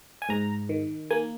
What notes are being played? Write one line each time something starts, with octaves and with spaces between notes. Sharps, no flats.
G#5
G#2 A#5
D#3
A#3 G#5